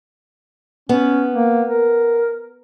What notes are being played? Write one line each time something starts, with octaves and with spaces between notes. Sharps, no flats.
B3 C#4
A#3
A#4